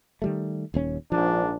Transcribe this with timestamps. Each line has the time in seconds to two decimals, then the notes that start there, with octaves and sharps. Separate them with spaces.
0.22 D#3 G3 A3
0.74 D#1 D#2 C#4
1.12 A#1 G#2 F3 D4